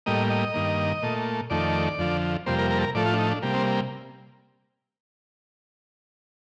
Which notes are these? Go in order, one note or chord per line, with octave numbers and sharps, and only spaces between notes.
A2 G3 A#3 D#5
D#5
G2 D#3 A#3
A#2 A3
F2 D#3 A3 D5
F2 D3 F3
F2 C3 G3 A#3 C5
A#4
A#4
A4
A#4
A2 F3 A3 D5
F4
D4
D#4
D4
C3 G3 A#3
C4